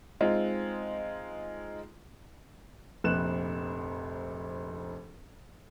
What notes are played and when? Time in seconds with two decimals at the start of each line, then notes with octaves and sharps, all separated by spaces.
0.21 G#3 C4 D#4 F4
3.04 F1 A#1 F#6 E7